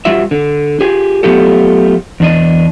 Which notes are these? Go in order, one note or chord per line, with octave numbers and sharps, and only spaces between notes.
G3 F4 F#4 E5
D3
F4 G4 G#4
F#3 A3 B3 F4 G4 A4
E2 D4 D#5